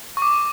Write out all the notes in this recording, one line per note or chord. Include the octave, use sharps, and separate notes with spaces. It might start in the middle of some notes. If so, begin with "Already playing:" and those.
C#6
D6